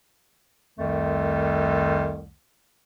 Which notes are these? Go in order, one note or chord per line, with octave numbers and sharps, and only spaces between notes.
C2 F2 D#3 A3